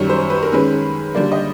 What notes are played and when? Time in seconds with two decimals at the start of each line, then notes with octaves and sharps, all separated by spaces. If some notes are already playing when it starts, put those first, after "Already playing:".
Already playing: F#2 D#3 G3 C#5
0.09 C5
0.30 B4
0.43 A#4
0.52 D#3 G#3 C#4 B4
1.15 D3 G3 A#3 D5
1.32 D#5